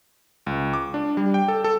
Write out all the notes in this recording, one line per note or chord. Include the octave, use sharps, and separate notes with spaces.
C#2
D6
D4
G3
G5
A4
A4